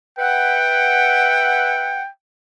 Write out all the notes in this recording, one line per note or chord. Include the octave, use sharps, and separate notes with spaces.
B4 E5 F#5 G5